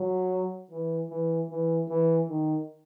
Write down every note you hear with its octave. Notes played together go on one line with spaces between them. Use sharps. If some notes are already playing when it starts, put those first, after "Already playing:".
Already playing: F#3
E3
E3
E3
E3
D#3